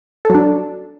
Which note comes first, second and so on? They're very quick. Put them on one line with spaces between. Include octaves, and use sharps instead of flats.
A4 F#3 D4